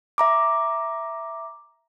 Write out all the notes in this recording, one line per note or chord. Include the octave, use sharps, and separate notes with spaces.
E5 A#5 D6